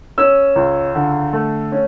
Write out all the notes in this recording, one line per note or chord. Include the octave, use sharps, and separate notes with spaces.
C#4 E6
C#2
D3
A3
C#4